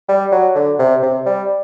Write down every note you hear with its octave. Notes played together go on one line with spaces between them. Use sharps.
G3
F#3
D3
C3
C3
G3